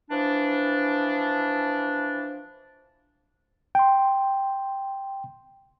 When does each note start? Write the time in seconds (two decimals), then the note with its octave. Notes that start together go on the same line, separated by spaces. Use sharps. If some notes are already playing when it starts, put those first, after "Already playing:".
0.11 E3 F3 D4
3.75 G5 C6